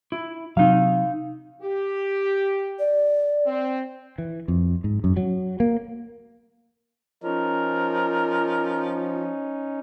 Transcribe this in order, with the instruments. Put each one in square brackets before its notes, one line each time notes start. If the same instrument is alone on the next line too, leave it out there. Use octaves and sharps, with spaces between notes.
[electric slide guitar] E4
[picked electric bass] C3 F#3 [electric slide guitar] D#4 F5
[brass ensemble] G4
[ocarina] D5
[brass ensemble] C4
[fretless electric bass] E3
F2
G#2
F#2
F#3
A#3
[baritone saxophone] F3 [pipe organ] C#4 D#4 [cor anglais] A#4